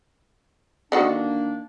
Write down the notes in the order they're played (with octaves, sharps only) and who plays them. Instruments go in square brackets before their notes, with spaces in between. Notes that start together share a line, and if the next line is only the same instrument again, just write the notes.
[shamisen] D3 D#3 F#4 [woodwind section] A#3 D4